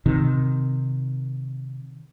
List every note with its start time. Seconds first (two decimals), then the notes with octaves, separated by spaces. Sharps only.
0.06 C3 D#3